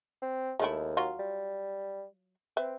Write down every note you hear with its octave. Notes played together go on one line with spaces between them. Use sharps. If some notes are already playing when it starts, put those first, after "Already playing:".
C4
D#2 G#3 A3 E4
F#3 F4
G3
C4 B4 E5